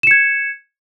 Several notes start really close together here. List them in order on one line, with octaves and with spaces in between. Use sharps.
E7 C#7 G#6